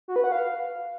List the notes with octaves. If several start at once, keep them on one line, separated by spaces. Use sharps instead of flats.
F#4
B4
F#5
F5